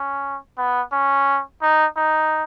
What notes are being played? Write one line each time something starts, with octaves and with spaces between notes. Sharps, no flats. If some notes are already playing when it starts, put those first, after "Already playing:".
Already playing: C#4
B3
C#4
D#4
D#4